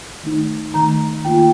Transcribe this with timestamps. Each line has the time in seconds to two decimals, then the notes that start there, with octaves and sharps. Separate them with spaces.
0.23 D#3 A3 D#4
0.74 D#3 A3 D#4 A#5
1.24 D#3 A#3 F4 G5
1.38 G5